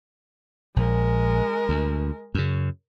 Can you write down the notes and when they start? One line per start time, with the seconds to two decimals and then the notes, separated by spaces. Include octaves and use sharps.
0.76 A#1 G#3 A#4
1.69 D2
2.35 F#2 C#3